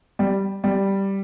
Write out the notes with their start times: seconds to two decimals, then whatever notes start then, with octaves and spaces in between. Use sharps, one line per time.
0.19 G3
0.64 G3